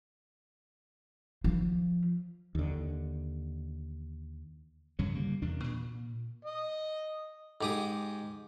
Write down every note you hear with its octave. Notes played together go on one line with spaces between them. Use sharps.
F3
D#2 D3
D2 G2 C#3 F#3
D3 G3 A#3
E2 C3 D#3 D4
A#2
D#5
G#2 G4 D#6